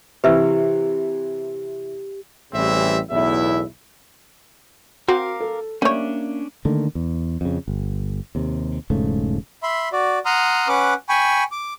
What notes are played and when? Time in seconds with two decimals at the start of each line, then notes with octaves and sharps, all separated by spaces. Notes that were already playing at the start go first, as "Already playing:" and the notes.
0.24 C3 E3 E4 G4 B4 E5 E6
2.53 A1 C#3 E3 G3 C4 E5
3.10 B1 E2 A2 E4 E5
5.08 C4 F#4 A#4 F5 D6
5.40 A4
5.82 G3 A#3 C#4 D4 C#5 E5
6.65 D3 D#3 A3 A#3
6.95 E2
7.41 F2 C#3
7.68 G1
8.35 D#2 C3
8.90 E1 G#2 C#3 A3
9.63 E5 B5 C6
9.92 F#4 D5
10.25 F#5 A#5 C6 D#6 F6
10.68 C#4 B4 F#5 D6
11.09 G5 G#5 B5 C#6
11.52 D6